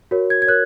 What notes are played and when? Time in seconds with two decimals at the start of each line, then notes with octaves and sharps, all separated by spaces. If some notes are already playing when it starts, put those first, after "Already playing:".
0.11 F#4 A#4 C#5
0.30 G#6
0.42 G#6
0.47 A#4 C#5 F#6